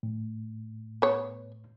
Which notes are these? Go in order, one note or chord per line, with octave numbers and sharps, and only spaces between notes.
A2
B3 C#5